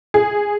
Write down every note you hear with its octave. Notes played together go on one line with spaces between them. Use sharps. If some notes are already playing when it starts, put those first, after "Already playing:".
G#4